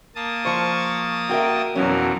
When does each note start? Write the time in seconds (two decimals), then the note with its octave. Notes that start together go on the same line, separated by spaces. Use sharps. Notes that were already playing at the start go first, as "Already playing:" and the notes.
0.15 A#3 A5 D#6
0.45 F3 C5 C#6
1.29 F#4 A#4 E5 G5
1.76 F2 B2 E3 F#3 C#4 A#4